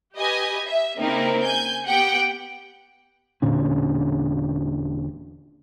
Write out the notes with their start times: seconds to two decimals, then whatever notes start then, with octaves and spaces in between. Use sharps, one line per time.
0.16 G4 B4 D#5 G#5
0.68 E5
0.99 C#3 A#3 C4 D#4 E4 A#4
1.43 G#5 G6
1.85 B3 G4 F#5 G5
3.42 E1 A#2 D3 C#4